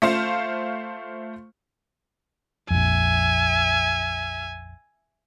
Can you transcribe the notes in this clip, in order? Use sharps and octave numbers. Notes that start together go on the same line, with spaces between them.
A3 F4 C5 F5
A#1 F2 E5 G#5